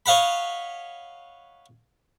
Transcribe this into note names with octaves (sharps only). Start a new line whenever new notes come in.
C#5 D#5 F5 F#5 B5